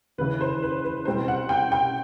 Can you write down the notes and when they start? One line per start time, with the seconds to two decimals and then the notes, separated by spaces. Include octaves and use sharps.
0.18 D#2 C#3 E3 B4
0.41 C5
0.63 B4
0.85 B4
1.05 B2 G3 C4 C5
1.28 F#5
1.49 G5
1.72 G5